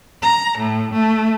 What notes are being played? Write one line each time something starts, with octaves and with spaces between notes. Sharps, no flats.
A#5
A2
A3